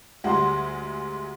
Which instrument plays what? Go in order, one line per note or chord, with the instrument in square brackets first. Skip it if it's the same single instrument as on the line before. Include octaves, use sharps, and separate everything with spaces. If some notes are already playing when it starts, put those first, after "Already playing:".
[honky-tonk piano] D2 G3 G#3 [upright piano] F#5 C6